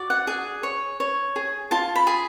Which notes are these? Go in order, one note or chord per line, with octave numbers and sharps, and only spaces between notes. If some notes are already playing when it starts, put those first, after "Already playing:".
Already playing: F#4 D5
F#5
G#4 G#5
C#5
C#5
G#4
F4 A5
B5
G#4